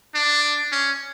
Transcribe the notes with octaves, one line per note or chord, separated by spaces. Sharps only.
D4
C#4